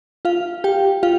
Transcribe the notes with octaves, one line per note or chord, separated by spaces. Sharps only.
F4 F5
G4 G5
F4 F5